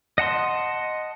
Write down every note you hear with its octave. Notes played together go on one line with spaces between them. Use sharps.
D#5 F#5 A5 C6